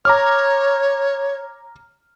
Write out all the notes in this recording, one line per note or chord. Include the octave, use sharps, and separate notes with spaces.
C#5 A#5 D6 F6